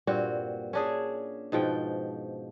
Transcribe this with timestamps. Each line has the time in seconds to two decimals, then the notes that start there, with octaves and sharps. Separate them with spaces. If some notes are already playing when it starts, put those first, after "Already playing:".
0.07 G2 A#2 C4 F#4
0.73 C#4 D4 G#4
1.52 G#2 B2 F3 G5